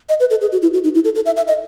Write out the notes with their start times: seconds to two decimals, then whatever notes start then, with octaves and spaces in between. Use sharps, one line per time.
0.09 D#5
0.20 B4
0.30 A4
0.41 G#4
0.52 F#4
0.62 E4
0.74 F#4
0.84 D#4
0.95 E4
1.04 A4
1.15 A4
1.26 E5
1.36 E5
1.48 D#5